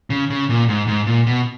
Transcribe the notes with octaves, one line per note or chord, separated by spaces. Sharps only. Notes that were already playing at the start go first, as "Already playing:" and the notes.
C#3
C#3
A#2
G#2
G#2
A#2
B2